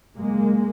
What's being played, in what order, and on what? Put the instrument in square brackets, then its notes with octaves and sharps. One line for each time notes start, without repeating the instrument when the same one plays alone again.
[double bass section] F#2 C#3 G#3 A#3